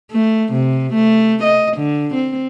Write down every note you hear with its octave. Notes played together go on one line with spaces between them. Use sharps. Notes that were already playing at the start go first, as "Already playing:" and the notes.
A3
C3
A3
D#5
D3
C4